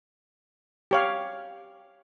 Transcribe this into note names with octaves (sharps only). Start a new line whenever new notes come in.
G4 C#5 F5